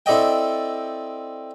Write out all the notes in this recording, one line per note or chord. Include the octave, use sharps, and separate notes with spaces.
C4 E4 A4 D5 D#5 G5